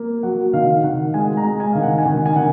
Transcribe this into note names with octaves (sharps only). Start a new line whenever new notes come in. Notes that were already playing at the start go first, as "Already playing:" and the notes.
Already playing: A#3
F#3 F#5
D#3 F5
D#3 F#5
G#3 G#5
A#5
G#3
G#5
D#3 F5
F#5
G#5
D#3 F#5
G#5
D#3 F#5